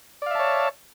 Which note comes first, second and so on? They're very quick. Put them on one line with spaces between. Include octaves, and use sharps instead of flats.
D5 F5 E5 A5 C#5